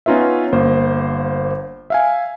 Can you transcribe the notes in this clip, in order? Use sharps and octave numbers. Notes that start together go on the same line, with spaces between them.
B3 C#4 D#4 F4 B4 E5
G1 A#3 C5
E5 F5 G#5